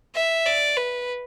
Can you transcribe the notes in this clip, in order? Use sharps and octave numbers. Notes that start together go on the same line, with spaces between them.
E5
D5
B4